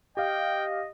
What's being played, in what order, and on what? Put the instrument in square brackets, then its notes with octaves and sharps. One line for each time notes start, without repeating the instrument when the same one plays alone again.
[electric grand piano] G4 F5 [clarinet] D#5 [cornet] G5